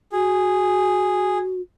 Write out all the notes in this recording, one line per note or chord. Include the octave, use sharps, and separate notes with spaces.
F#4 G#4